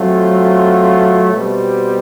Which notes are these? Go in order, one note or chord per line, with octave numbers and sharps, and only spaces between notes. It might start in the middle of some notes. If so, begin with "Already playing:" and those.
Already playing: F#3 A3 C4 F4
B2 G3 C4